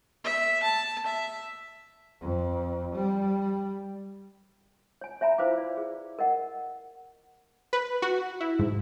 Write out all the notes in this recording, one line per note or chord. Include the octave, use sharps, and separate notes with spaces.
E5
A5
E5
F2
G3
C#5 G#5
C#5 E5 G#5 A#5 B5
E4 F4 B4 C5 F5 D6
D5
G#4
A#4 D#5 F#5
B4
F#4
E4
G#2